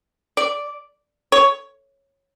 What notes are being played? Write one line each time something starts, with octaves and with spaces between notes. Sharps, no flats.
D5
C#5